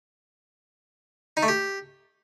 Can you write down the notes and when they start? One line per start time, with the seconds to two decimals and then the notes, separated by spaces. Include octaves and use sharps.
1.37 D#4
1.43 A3
1.48 G4